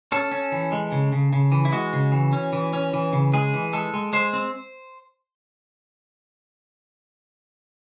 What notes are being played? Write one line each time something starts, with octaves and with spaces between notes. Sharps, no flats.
C#4 A4
C#4
E3
G#3
C#3
C#3
C#3
E3
E4
G#3 F#4
C#3
E3
C#4
E3
C#4
E3
C#3
G#3 G#4
E3
G#3 A4
G#3
G#3 C5
C4